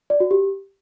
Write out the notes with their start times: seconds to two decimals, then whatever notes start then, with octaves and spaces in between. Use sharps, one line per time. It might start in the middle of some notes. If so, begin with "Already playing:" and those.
0.10 D5
0.20 F#4
0.31 G4